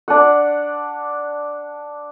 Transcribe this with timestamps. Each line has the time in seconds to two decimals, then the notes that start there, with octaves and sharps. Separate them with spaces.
0.08 D4 F#5